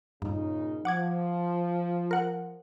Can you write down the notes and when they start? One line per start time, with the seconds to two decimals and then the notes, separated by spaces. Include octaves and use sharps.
0.22 G2 A#2 C#3 D#4
0.85 F3 F#5 D6 G#6
2.11 A#4 F#5